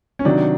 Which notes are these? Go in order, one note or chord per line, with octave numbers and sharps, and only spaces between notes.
C#4
C3 D#3 F#3 D4